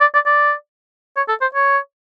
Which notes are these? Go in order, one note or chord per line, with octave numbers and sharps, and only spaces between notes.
D5
D5
D5
C#5
A4
C5
C#5